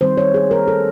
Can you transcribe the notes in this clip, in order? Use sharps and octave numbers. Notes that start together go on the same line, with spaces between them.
D#3 G3 C4 C5
C#5
G#4
A#4
A4